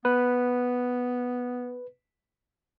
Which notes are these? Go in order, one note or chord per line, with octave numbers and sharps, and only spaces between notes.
B3 B4